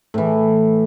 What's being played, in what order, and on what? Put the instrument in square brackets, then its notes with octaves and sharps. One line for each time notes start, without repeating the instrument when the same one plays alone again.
[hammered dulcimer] A2 E3